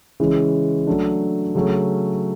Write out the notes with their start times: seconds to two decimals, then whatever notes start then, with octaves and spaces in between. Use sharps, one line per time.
0.20 C#3 E3 G#3 C#4
0.87 F#3 A3 D4
1.55 C#3 F#3 A3 C#4